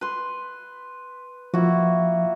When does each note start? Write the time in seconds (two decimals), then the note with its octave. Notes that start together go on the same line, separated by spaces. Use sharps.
0.01 B4 C6
1.54 F3 A#3 E4 F#4